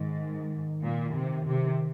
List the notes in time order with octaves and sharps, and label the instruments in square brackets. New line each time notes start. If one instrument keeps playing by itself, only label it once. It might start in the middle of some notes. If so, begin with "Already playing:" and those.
Already playing: [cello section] G#2 [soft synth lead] D#3
[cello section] A#2
C3
C3